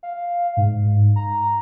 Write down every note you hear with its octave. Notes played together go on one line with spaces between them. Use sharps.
F5
G#2
A#5